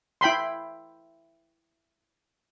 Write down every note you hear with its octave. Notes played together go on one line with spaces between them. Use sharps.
E4 G5 B5 C6